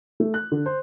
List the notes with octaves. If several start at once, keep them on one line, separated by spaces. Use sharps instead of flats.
A3
F#6
D3
C5